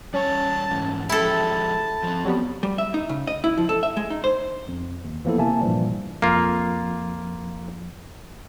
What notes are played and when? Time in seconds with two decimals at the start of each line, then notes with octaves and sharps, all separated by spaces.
0.14 G3 C#4 C#5 A5
0.71 G#2 E3
1.09 F3 G#3 E4 G4 A4 A5
2.03 F3 C4
2.25 F#3 G3 B3
2.63 G3
2.78 E5
2.94 D#4
3.09 C#3
3.27 D#5
3.44 E4
3.58 F3
3.69 A4
3.83 E5
3.97 G#3
4.10 D#4
4.24 C5
4.68 F2
5.05 D#2
5.25 E3 F3 A#3 B3 E4 A4
5.38 C3 A#3 E5 G#5 A5
5.61 G2 A#2 E3 F3 G3
6.22 F2 A#3 F4